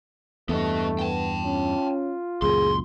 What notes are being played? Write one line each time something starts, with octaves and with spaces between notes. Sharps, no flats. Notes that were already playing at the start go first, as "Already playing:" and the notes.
E2 G2 A3 B3 D#5
B3 G5 A5
C#4 F4
C#2 F#2 A#2 G#4 C6